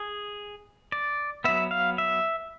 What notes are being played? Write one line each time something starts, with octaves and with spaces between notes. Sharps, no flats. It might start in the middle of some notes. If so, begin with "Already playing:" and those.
Already playing: G#4
D5
F#3 B3 E5
F5
E5